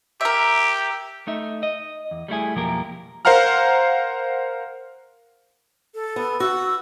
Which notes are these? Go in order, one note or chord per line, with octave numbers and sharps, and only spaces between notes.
G4 A#4 E5
A3 D#4 E5
D#5
E2
G3 A3 E4 G#4
B1 F2 F3 A#3 G4 A#4
A#4 C5 F5 F#5 A#5 F6
A4
B3
F#4 E6